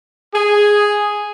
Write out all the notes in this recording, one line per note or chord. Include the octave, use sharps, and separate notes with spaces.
G#4